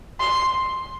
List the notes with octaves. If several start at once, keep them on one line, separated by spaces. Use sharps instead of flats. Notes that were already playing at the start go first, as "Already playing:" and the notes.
C6